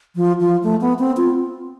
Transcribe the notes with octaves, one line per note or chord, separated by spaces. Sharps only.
F3
F3
A3
B3
C4
F4